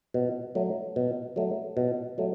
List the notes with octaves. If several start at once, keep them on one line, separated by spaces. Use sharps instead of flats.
B2
F#3 A3
B2
F#3 A3
B2
F#3 A3